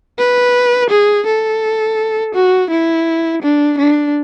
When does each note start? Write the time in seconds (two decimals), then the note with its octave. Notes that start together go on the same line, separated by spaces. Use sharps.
0.19 B4
0.90 G#4
1.26 A4
2.34 F#4
2.70 E4
3.42 D4
3.78 D4